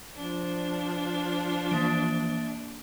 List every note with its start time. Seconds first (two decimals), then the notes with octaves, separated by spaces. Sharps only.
0.16 F3 D4
1.71 E3 A#3 A6 D7